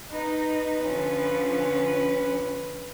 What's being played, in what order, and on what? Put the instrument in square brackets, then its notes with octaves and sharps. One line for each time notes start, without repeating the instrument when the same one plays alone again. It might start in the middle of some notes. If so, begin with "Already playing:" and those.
[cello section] D#4 [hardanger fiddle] B4
[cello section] D3 F3 C#4